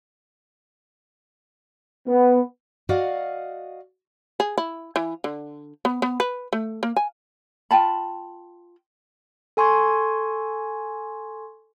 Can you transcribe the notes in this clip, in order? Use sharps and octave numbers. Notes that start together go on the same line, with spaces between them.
B3
F#4 D5 D#5 F5 F#5
G#4
E4
E3
D3
B3
B3
B4
A3
A#3
G#5
F4 G5 A5 B5
A4 G#5 C6 C#6 G#6